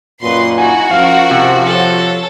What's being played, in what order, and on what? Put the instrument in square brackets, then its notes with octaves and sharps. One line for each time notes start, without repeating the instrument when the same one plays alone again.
[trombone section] F#2 A#2 [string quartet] F#4 B4 D#5 [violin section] C6
[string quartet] D#4 E4 [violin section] F#4 [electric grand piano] G#5
[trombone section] F3 [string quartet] C#4 A#4 [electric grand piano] F5 F6
[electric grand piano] C3
[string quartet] A4 C#5